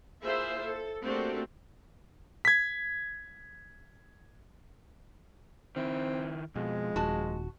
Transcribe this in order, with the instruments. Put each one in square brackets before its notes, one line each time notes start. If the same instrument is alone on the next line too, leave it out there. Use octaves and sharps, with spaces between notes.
[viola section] A#3 E4 F4 G#4 C5 E5
A4
A3 A#3 C4 D4 F#4 G4
[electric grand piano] G#6 B6
[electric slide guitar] D#3 E4 [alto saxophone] C4
[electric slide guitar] F2 [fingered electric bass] B2 [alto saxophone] G#3
[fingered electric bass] D#1 [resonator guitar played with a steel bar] F#4 A5